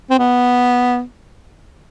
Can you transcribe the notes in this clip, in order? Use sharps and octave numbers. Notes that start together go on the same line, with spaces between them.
C4
B3